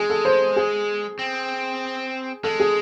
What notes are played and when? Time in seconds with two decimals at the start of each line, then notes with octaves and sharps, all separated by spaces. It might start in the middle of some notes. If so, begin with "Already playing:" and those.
Already playing: G#3 G#4
0.10 A4
0.25 C5
0.56 G#4
1.19 C4
2.44 G#3 A4
2.60 G#4